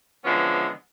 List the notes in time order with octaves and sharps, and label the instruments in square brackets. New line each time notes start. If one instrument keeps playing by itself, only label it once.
[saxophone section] D3 E3 F3 G#3 B3 C#4